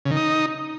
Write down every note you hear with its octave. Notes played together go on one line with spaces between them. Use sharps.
C#3
D#3
D#4